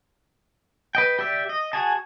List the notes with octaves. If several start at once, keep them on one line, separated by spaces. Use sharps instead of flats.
B4 D#5 G5
G4 D5 E5
D#5
F#4 G#4 G#5 A5